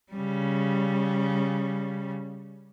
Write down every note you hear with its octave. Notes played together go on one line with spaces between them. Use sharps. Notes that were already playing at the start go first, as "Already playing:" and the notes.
C#3 G3